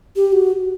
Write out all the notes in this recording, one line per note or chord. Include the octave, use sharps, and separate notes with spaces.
G4
F#4